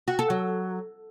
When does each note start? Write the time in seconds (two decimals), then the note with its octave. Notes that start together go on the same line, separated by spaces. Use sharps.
0.08 F#4
0.19 A4
0.30 F#3